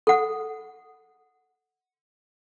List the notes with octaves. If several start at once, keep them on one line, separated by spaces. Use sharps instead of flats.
A4 F#5